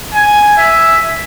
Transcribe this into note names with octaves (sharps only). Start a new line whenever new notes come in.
G#5
E5